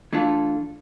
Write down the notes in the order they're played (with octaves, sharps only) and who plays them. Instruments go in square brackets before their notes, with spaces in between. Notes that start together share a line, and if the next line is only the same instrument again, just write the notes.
[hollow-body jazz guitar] E3 A3 D4 F4 A4